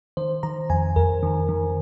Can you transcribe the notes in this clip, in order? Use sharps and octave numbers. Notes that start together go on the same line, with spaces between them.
D#3 C5
D#3 A#5
F2 G#5
F2 A#4
D#3
D#3